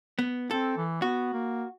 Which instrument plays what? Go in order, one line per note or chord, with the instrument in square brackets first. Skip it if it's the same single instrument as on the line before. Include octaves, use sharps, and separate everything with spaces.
[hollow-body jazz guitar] B3
[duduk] C4 [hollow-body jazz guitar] A4
[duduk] E3
[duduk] B3 [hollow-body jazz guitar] F#4
[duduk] A#3